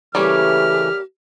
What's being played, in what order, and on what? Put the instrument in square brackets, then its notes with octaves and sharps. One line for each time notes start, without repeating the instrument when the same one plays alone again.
[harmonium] C#3 E3 A3 [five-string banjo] G3 A#3 C#4 [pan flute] G4 [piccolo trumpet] F6